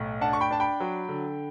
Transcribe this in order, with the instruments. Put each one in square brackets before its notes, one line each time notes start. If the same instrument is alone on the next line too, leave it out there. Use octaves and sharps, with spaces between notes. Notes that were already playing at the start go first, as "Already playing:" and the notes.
Already playing: [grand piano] B1 A2
D4 F#5 A5
C#6
G5 B5
D4 A5
G5 B5
F#3
D3